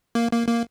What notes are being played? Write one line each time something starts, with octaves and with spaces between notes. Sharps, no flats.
A#3
A#3
A#3